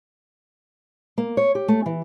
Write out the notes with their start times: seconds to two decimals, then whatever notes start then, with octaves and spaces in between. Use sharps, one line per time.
1.18 A#3
1.37 C#5
1.55 G4
1.68 A3
1.86 E3